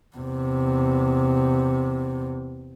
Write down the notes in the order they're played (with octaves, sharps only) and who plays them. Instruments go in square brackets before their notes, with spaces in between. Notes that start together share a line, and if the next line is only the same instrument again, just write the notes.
[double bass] E2 C3